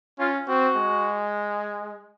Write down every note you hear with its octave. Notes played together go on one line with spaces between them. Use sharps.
C#4 F4
C4 F#4
G#3